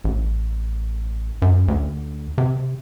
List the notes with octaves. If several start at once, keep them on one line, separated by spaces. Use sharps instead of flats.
A1
F#2
D2
C3